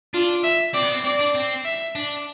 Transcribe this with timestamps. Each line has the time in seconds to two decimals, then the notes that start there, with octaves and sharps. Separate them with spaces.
0.14 D4 F4
0.44 E5
0.74 C4 D5
0.84 B3
0.92 C4
1.04 C4 D5
1.20 D4
1.35 C4
1.65 E5
1.95 D4